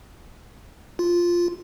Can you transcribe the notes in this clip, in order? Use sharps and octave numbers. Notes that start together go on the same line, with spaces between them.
F4